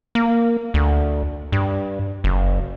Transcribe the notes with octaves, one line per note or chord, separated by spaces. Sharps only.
A#3
D2
G2
F#1